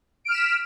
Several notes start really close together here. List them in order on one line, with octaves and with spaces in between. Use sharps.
D7 F6 E7 B6